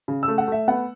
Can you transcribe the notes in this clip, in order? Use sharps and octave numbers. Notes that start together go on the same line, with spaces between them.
C#3
E6
A3
F#5
A3 E5
B3 F#5